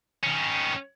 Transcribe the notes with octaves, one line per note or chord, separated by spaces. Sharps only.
D#3 C#4